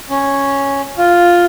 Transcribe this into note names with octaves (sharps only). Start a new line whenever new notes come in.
C#4
F4